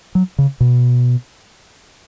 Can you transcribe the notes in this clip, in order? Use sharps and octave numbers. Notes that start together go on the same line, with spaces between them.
F#3
C#3
B2